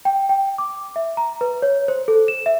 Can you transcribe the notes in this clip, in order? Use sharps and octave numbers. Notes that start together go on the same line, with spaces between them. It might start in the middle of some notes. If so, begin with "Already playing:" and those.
G5
G5
D6
E5
A#5
B4
C#5
C5
A4
E7
E5